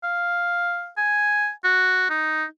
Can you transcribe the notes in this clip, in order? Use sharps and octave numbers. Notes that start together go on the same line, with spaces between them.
F5
G#5
F#4
D#4